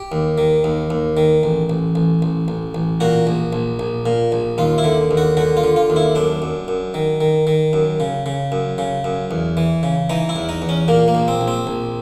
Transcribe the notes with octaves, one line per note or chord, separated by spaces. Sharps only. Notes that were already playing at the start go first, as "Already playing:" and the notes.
Already playing: G4
D#2
D#3
D#2
D#2
D#3
A1
A1
A1
A1
A1
A1
A#2 F#4
A#1
A#1
A#1
A#2
A#1
D#2 F4
E4
D3
D#2
F#4
D3 F#4
F4
D3
F4
D#2
E4
F#2 D4
F#2
F#2
D#3
D#3
D#3
F#2
C#3
C#3
F#2
C#3
F#2
E2
E3
C#3
E3 D#4
E4
E2
D#4
E2
C#4
A#2 A#3
A#3
A#1
C4
A#1
C4
A#1